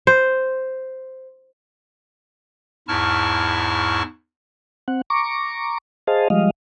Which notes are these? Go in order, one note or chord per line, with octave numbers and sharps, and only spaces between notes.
C5
E2 G#2 E4 A5 C#6 F6
C4 F#5
A#5 C#6 D6
G#4 C5 D#5 F5 A5
F3 G3 G#3 D#5 F5